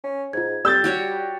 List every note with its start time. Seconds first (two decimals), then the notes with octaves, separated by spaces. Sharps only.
0.04 C#4
0.33 G#2 F4 G#6
0.65 G3 E6 G6 A6
0.84 F#4 G4 C#5